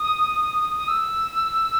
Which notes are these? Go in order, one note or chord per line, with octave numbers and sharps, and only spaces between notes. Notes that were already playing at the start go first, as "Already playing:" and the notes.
Already playing: D#6
D#6
E6